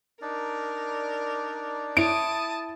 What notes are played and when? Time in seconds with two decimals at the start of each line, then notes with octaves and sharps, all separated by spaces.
0.22 D4 D#4 A#4 D5
1.97 E4 C#5 A5 D#6 D7